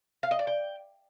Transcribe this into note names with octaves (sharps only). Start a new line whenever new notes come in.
F5
D#5
D5
G5